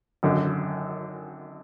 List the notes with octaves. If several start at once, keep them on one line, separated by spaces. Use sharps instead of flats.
G#1 F#2 D3